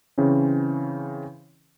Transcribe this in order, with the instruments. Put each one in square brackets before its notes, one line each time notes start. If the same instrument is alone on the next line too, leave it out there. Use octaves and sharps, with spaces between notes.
[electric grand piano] C#3 E3 C4 C#4